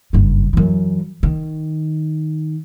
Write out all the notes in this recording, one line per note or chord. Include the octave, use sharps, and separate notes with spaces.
F#1 G2
F#2 E3
D#3